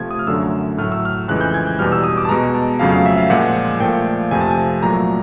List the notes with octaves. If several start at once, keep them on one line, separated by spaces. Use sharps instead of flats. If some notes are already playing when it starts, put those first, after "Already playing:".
Already playing: C3 F3 A3 G#6
D#6
F6
F#2 D3 F#3 A3 E6
A2 F#3 A3 F6
E6
F6
F2 C#3 E3 G#3 F#6
G6
G#6
G6
E2 B2 G3 F6
E6
D#6
D6
A5
B2 G#3 A#5
A5
F2 C#3 F#3 A3 F5
F5
E5
F5
A#2 F3 G#3 F#5
A#2 F3 A3 G5
F2 C3 F3 A3 G#5
A5
G#5
A#2 F#3 A3 A#5